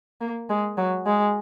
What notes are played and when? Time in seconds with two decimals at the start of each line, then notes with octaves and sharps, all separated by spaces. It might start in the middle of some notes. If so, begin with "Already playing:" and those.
0.21 A#3
0.49 G#3
0.77 F#3
1.06 G#3